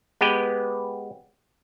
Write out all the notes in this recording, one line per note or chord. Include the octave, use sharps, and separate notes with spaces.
G#3 B3 G4 B4 G5